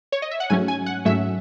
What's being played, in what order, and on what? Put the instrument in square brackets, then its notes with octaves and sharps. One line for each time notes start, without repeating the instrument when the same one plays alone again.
[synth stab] C#5
D#5
E5
F#5
G#2 F#3 A3 C#4 G#5
G#5
F#5
G#2 F#3 A3 C#4 E5